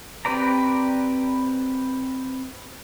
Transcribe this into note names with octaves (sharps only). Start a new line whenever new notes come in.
C4 G4 B4 D5 A#5